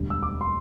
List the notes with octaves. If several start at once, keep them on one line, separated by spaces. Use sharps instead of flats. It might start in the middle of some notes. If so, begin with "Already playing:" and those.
Already playing: E1 D2 D3 G3
E6
D6
C6